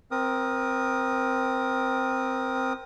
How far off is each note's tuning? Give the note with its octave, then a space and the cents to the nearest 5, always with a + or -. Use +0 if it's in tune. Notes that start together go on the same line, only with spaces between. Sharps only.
C4 +0 A#4 +20 D#6 -15